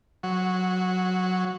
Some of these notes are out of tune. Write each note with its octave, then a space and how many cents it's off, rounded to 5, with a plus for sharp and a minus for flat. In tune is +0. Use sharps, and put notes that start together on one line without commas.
F#3 -5